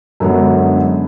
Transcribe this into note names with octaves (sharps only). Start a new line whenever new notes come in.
F#2 D3 F#3 G#3 B3